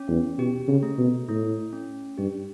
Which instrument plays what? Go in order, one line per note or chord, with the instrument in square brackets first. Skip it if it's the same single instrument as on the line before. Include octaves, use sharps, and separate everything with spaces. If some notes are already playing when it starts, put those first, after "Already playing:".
Already playing: [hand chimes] C#4
[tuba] E2
[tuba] B2 [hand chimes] G4
[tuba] C#3
[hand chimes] A3
[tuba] B2
[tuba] A2 [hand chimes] A3
[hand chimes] C#4
[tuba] G2 [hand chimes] G4